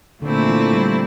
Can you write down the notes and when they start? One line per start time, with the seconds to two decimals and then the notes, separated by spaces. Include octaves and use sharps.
0.21 A#2 D3 A3 C4 E4
0.47 E3
0.73 G3